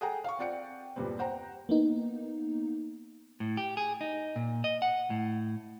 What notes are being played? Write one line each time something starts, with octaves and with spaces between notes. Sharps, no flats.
G#4 A4 F#5 G5 A#5
F5 C#6
C4 F4 D5 F#5 G5 C#7
E2 G2 A#2 G3 B3 C4
C5 F#5 G5 A#5
A#3 B3 D#4
A2
G4
G#4
D#4
A#2
D#5
F#5
A2